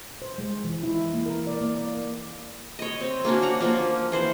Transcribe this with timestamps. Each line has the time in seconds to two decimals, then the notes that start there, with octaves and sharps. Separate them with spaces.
0.22 C5
0.38 G#3
0.64 E3
0.83 E4
1.13 A#3
1.26 A#4
1.47 D5
1.61 A#3
1.77 D5
2.79 C#5 D#5
3.01 C4
3.25 A#3 C#4 D4 F#4
3.42 F#5 A#5
3.61 F3 A#3
4.12 E3 C5 F#5